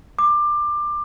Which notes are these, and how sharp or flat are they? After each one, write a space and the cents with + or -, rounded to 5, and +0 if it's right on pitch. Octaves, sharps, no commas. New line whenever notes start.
D6 +20